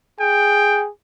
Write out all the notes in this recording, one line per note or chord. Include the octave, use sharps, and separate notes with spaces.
G#4 G5